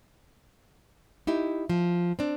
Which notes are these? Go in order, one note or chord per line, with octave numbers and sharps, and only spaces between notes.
D#4 E4 G4
F3
C4 D4